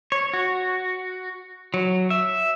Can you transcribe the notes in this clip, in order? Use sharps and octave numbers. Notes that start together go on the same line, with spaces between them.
C#5
F#4
F#3
E5